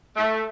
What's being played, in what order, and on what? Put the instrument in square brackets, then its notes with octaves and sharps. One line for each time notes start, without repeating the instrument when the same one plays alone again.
[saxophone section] A3